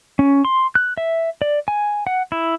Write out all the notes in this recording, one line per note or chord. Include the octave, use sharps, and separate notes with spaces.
C#4
C6
F#6
E5
D5
G#5
F#5
E4